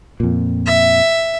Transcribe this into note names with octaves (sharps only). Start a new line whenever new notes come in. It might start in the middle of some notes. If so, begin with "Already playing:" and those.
F2 A#2
E5